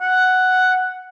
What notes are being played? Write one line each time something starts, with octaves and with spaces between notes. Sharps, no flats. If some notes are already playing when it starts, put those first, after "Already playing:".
F#5